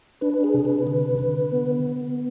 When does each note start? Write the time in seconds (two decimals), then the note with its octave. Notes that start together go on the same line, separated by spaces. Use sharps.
0.21 D4 B4
0.34 B4
0.44 G#4
0.54 C3
0.59 G#4
0.65 B4
0.87 D3
1.19 D3
1.52 B3